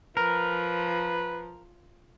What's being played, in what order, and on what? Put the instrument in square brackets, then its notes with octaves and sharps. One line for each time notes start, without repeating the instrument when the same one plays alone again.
[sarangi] F3 [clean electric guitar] A#4 [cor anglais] B4